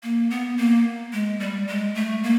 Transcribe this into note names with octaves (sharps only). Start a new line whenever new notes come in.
A#3
B3
A#3
G#3
G3
G#3
A3
A#3